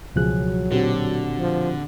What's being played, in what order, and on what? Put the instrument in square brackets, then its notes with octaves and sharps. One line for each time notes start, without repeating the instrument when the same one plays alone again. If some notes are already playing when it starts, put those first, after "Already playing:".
[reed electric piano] C#2 F3 F#6 [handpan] B2 G#4 [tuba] F#3
[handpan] A#2 G4 [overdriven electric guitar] D3 [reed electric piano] C4 F#4
[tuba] F3